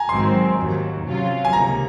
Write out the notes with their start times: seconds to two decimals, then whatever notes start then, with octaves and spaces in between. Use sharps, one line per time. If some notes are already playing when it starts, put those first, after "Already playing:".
Already playing: G#5 A#5
0.09 G#1 G#2 D#3 F#3 C4 C6
0.57 D#2 D#3 F#3
1.04 C3 F#3 C#4 F4
1.45 G#5
1.53 C#2 C3 D#3 A#3 C#4 A#5